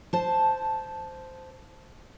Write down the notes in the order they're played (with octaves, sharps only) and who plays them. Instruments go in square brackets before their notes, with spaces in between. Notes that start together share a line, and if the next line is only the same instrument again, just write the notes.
[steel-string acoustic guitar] C5 A5